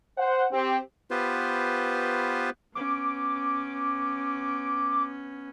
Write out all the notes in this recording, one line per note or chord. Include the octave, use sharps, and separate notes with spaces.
C5 F#5
C4 G4
B3 F4 G4 B4 C5
B3 C#4 D6